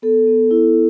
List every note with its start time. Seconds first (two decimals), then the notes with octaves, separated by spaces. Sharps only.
0.02 B3 A4
0.27 B3
0.51 E4